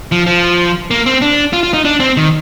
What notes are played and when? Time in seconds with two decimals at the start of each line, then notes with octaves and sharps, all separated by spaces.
0.12 F3
0.27 F3
0.91 A#3
1.06 C4
1.22 D4
1.53 F4
1.63 F4
1.74 D#4
1.85 D4
2.00 C4
2.17 D#3